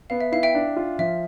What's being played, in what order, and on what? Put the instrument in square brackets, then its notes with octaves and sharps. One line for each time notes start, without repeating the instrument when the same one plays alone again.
[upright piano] B3 [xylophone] F5
[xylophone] E5
[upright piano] E4 [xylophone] F5
[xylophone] E5 G5
[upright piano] D4
F4
[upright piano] F3 [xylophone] E5